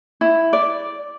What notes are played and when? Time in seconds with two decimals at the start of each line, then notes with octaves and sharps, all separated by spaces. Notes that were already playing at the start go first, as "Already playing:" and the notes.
0.21 E4
0.53 D5